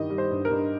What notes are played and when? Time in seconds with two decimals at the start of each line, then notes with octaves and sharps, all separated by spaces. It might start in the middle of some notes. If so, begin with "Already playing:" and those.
Already playing: G2 D#3 G3 D#5
0.10 G3
0.18 C5
0.31 G2
0.45 A#4
0.51 G2